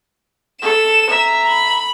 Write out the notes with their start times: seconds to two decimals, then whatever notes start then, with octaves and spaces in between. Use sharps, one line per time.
0.62 A4 E7
1.10 E5 A#5
1.49 B5